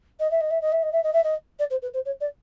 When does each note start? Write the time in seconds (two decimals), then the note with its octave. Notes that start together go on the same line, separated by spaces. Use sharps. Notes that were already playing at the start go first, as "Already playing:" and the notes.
0.19 D#5
0.30 E5
0.40 D#5
0.50 E5
0.61 D#5
0.72 E5
0.82 D#5
0.92 E5
1.03 D#5
1.13 E5
1.23 D#5
1.59 D5
1.70 C5
1.82 B4
1.93 C5
2.05 C#5
2.20 D5